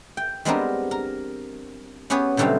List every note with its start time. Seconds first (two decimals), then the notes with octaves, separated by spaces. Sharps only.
0.17 G5
0.45 G3 G#3 B3 C4 D4 A#4
0.91 A#4
2.10 B3 C#4 G4 G#4 B4 C#5
2.37 B2 D3 F#3 G3 A3 C4